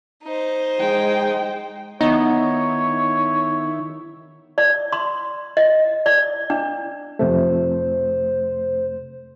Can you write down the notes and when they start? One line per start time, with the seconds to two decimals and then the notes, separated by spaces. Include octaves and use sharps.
0.23 D#4 C5
0.80 G#3 G5
2.01 D#3 B3 D#4 E4 C#5
4.58 D5
4.92 C6
5.57 D#5
6.06 D5
6.50 D4
7.19 F2 C3 A3 C5